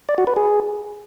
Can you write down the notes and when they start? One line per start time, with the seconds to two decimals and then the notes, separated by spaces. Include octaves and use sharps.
0.09 D5
0.18 F#4
0.27 B4
0.36 G#4